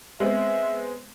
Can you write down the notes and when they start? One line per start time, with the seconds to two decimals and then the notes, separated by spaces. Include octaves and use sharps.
0.20 G#3 B3 C4 E5